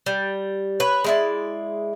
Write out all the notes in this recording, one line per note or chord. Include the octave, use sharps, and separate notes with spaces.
G3
B4 C#5
G#3 E4 D5